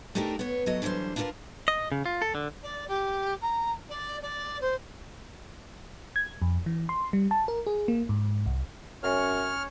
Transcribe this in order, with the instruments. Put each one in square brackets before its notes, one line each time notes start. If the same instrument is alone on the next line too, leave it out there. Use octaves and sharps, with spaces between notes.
[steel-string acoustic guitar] A3 D4 D#4 G4 A4 A#4
B3 C#5
F#3 A3 F#4 D#5
D3 E3 F#3 G3 C5
D4 E4 F4 G#4 A#4 B4
[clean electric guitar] D#5
C#3
F4
A4
D3
[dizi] D5
G4
A#5
D5
D5
C5
[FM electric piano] G#6
F2
E3
C6
G3
A5
A#4
G#4
A#3
G#2
C2
[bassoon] F#2 [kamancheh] C#4 [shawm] C#5 [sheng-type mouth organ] F6